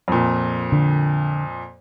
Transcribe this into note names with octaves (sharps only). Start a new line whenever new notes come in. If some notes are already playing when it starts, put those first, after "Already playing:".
F2 A#2
D3